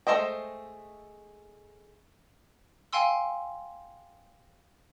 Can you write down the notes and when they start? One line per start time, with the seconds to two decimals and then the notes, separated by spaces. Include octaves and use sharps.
0.07 G#3 A3 C5 D#5 G5
2.93 F5 G5 G#5 C6 E6